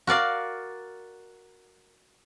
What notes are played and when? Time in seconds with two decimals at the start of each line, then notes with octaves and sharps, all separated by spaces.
0.07 F#4 A#4 D5 F5